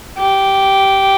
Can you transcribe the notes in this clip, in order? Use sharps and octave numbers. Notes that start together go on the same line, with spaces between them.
G4